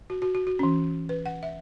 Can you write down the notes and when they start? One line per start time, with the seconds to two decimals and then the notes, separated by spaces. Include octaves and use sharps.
0.10 F#4
0.22 F#4
0.35 F#4
0.47 F#4
0.59 E3 C#4
1.09 B4
1.26 F#5
1.43 E5